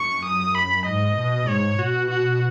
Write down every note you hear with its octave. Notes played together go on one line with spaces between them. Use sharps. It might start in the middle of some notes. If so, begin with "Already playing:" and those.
Already playing: F#2 C#6
D#6
B5
G#2 D#5
B2
G#2 C#5
B2 F#4
F#4